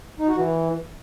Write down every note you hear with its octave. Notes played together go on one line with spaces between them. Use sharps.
D#4
F#4
E3